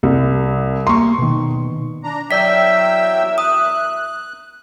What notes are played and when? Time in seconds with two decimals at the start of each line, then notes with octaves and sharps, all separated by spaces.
0.03 C2
0.87 A#3 A#5 C6 C#6
1.18 B2 D#3
2.04 D4 A#5
2.31 E2 F#3 A#4 D5 E5 G5 E6 B6
3.38 D#6 F#6